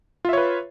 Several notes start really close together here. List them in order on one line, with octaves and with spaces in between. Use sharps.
F4 E5 C#5 B4